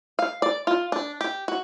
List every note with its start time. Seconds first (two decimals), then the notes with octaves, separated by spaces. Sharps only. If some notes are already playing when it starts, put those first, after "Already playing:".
0.19 F5
0.42 D5
0.67 F4
0.92 D4
1.21 G4
1.48 F#4